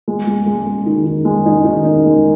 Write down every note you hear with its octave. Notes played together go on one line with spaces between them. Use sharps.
G#3
G#3
G#3
G#3
D#3
D#3
G#3
D#4
D#3
D#4
G#3